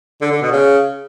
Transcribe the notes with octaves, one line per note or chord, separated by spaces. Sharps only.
D3
D3
B2
C#3